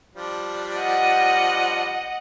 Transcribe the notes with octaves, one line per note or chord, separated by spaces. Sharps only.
F3 G3 D4
D#5 F#5